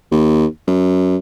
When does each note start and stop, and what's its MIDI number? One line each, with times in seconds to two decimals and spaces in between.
0.12 0.46 39
0.67 1.17 42